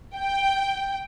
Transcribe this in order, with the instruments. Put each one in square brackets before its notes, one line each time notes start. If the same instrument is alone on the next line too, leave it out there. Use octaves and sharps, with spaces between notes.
[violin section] G5